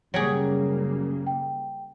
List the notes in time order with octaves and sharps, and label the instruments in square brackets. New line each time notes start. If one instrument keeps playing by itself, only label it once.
[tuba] F#2 [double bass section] C#3 G3 A#3 [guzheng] F#3 G4 G#4
[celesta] G5